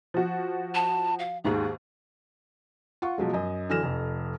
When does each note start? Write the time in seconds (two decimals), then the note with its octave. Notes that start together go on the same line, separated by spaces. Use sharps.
0.14 F3 F#4
0.74 A5
1.19 F5
1.44 D#2 G#2 D#3 G#4
3.02 F4 F#5 C#6
3.18 B2 F3 F#3 G#3
3.33 F#2 D#5
3.70 D3 E3 F#3 F6 A#6 E7
3.83 F1 F2